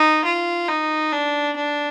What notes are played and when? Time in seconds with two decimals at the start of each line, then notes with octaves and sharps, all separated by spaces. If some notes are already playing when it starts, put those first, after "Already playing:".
Already playing: D#4
0.25 F4
0.68 D#4
1.13 D4
1.56 D4